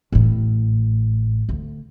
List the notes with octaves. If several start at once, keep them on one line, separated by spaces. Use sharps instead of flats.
A1 A2
D2